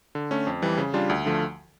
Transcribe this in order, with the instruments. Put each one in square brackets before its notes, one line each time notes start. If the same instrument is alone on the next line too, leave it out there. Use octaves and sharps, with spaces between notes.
[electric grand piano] D3
A3 C#4
F2
E3 G3
C#3
G3 D4 F4
D2
D3 F3 A3